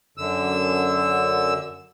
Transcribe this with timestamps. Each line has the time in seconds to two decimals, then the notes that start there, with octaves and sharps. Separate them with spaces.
0.17 F#2 D3 E6